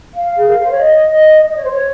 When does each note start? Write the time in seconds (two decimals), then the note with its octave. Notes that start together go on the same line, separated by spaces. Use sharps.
0.15 F5
0.37 G#4
0.49 A#4
0.60 C5
0.71 C#5
0.81 D#5
1.48 D#5
1.57 C#5
1.64 C5
1.71 C#5